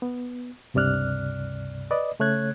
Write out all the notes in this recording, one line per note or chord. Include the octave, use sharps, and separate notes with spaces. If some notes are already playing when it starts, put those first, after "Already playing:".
B3
C#2 G2 C3 D5 F6 F#6
B4 D5 D#5
C#3 A3 C#5 F#6 G#6